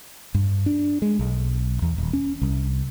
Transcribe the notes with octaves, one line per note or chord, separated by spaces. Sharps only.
G2
D4
G#3
B1
E2
D#1
C#4
C2